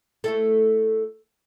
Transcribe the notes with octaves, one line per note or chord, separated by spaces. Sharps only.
A3 E4 A4